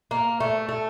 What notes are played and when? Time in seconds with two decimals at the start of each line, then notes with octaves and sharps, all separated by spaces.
0.11 A#3
0.40 A3
0.69 A3